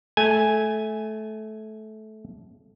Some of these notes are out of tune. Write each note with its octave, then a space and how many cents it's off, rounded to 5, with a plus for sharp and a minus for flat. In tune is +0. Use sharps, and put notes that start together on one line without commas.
A3 -20 G#5 +0